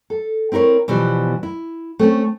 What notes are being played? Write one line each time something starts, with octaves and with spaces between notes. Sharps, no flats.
A4
C4 E4 A#4 B4 C#5
B2 E3 F3 G3 B3
E4
A3 C4 C#4